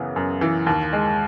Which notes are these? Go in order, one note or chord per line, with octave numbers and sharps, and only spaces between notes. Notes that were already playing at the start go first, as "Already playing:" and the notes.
Already playing: F#2 C#3 E3 B3
F#2
E3
D#2
G#3